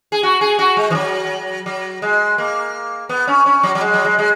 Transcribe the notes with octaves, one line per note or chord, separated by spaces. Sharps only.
G#4
F#4
G#4
F#4
G#3
E3
F#3
F#3
G#3
A#3
B3
C#4
C#4
F#3
F#3
G#3
F#3
G#3
G#3